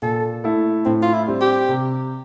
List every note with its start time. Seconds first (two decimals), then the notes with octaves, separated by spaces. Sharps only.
0.02 A#2 A4
0.44 A3 E4 A4
0.85 A2 C4
1.02 F4
1.13 E4
1.27 G3 C4
1.41 G4
1.69 C3